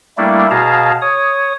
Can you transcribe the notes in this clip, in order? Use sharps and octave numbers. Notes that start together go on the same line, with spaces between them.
G3 A3 A#3 D4 E4
B2 G#4 F5 A5 A#5
C#5 D#6